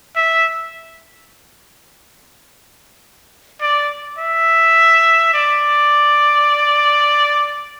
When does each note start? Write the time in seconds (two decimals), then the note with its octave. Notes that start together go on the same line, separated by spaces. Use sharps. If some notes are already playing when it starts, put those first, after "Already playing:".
0.16 E5
3.61 D5
4.19 E5
5.34 D5